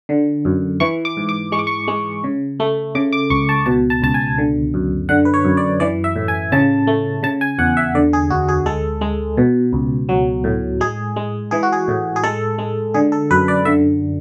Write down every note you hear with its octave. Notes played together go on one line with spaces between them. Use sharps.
D3
F#2
E3 C#6
D6
G#2
D6
G#3 C#6
D6
C#6
G#3
C#3
A3
C#3 D6
D6
C#2 C#6
A5
B2 A5
A5
C#2 A5
G#5
D3
F#2
D3 F#5
B4
C#5
F#2
D5
E3 D5
E5
A2
G#5
C#3 A5
A3
C#3 A5
G#5
E2 F#5
E5
D3 D5
G#4
D2 F#4
G#4
G#3 A4
G#3
B2
C#2
F#3
A2
G#3 G#4
G#3
E3 G#4
F#4
G#4
A2
G#4
G#3 A4
G#3
D3 G#4
A4
F#2 B4
D5
D3 E5